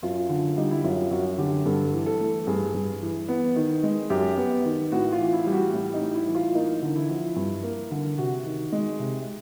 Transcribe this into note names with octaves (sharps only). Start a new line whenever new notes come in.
F#2 F4
D3
G3 D#4
E4
F#2 F4
F#2 F#4
D3 G4
G2 A4
E3
A4
A3
G2 G#4
G2
E3
B3
D#3
G#3
F#2 G4
B3
D#3
A2 F#4
F4
E3
E4
G3
F#4
A2
D#4
A2
E4
E3
F4
A#3 D#4
D3
E4
F3
G2
A#3
D3
C3 F#4
D#3
G#3
C3